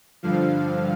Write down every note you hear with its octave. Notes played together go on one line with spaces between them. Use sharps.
G2 D3 F3 F5